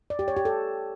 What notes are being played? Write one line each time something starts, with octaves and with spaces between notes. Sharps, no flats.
D5
G4
C#5
G4
A4